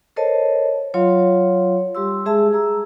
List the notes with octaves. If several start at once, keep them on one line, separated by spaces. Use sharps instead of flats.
A4 A#4 C5 C#5 D#5 A5
F#3 F4 C#5 F5 C6
G3 G4 C6 E6
G#3 G#4 E5 A5 E6
G#4 A#5 E6